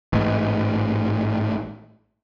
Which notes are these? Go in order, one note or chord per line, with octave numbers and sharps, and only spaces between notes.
A1 G#2